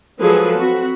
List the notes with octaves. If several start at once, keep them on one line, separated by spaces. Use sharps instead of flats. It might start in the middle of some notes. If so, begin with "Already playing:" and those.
F3 F#3 G#3 G#4 A4 B4
C4 F#4 B5